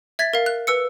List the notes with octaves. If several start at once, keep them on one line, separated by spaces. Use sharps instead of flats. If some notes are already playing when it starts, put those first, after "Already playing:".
E5 G#6 A6 B6
A#4 F5
F#6
B4 E6 C#7